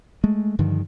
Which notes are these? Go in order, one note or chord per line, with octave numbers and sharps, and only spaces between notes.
G#3 A3
G2 D3 D#3 F3